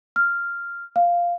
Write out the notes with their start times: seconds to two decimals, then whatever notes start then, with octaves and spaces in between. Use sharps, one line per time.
0.16 F6
0.96 F5